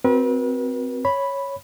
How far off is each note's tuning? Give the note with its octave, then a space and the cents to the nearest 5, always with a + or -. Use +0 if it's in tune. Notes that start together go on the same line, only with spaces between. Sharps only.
C4 -10 F#4 +0 B4 -40
C#5 +0 B5 +0